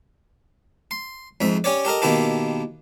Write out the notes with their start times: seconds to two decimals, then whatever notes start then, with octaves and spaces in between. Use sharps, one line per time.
0.91 C6
1.41 F2 G#2 E5
1.64 C#4 G4 C#5 D5
1.85 G4 A4 A#4 D#5
2.02 B2 D#3 A#3 E4 G4 A4